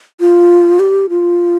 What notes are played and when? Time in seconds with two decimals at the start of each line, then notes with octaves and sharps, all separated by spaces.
0.20 F4
0.80 G4
1.09 F4